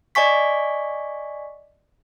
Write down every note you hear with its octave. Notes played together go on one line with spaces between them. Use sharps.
D5 D#5 G#5 C#6 B6